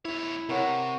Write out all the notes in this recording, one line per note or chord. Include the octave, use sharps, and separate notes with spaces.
E2 E4 C#5
C3 A#4 C#5 F#5